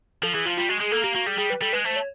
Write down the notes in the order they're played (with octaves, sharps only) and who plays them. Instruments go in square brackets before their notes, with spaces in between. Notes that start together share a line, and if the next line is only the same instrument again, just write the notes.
[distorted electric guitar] F3 [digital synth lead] A4
[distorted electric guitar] E3 [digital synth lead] G#4
[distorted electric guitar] F3 [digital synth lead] F4
[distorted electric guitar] G3 [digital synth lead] F4
[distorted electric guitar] G#3 [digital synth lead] F#4
[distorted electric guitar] G#3 [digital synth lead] G#4
[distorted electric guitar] A#3 [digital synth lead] A4
[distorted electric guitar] A#3 [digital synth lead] G4
[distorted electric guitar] A#3 [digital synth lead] F#4
[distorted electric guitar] G3 [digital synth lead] G#4
[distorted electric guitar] G3 [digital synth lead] G#4
[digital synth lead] B4
[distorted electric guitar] G3 [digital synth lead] A4
[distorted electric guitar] G#3 [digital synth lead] B4
[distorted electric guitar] A3 [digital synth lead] C5
[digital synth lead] C#5